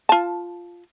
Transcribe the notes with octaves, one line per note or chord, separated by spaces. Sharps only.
F4 A5